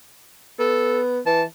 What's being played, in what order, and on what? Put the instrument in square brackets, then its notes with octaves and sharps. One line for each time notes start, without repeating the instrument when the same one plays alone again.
[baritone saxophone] B3 [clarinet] A4
[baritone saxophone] E3 [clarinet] A5